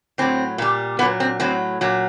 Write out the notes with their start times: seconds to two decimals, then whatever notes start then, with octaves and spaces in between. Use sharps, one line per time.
0.18 A2 F#3 C4
0.58 A#2 G3
0.99 A#2 B3
1.02 F#3
1.20 C4
1.40 A2 F#3 C4
1.81 A#2 F#3